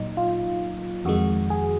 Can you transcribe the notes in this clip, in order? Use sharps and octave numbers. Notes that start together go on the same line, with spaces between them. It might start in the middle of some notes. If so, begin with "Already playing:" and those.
Already playing: A#2 F#3 D#4
F4
F2 D#3 G#3 F#4
G#4